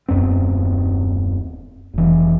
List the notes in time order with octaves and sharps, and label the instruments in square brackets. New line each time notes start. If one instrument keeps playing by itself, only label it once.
[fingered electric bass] D#1 F#2 B3 C4
F1 E3